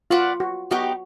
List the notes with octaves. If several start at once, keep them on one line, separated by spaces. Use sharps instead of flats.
F4 F#4 B4 D5
F#4
B3 D#4 F#4 G4